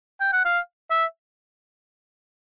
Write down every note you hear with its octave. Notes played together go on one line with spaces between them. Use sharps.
G5
F#5
F5
E5